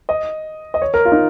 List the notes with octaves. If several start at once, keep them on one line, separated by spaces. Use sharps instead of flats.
D#5
D#5
C#5
A#4
F4
D#4